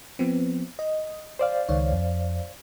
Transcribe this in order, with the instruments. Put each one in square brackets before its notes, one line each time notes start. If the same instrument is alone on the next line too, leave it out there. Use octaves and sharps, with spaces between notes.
[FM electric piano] F3 B3 C4
D#5
[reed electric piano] C5 D5 F5
[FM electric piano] C#2 D#3 C#5
F2